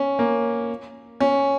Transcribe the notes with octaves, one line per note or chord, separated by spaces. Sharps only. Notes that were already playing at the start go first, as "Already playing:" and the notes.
Already playing: C#4
A#3
C#4